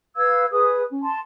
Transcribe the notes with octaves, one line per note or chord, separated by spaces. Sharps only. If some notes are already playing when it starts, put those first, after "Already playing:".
B4 F5 E6 G#6
G#4 B4 D#6
C#4
A5 C6